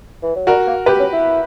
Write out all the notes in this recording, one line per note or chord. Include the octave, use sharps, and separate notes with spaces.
E3
F#3
G3 F#4 A#4
A#3
B3 G4 B4
C#4
E4